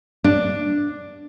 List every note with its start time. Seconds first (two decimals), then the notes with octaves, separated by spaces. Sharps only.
0.24 D4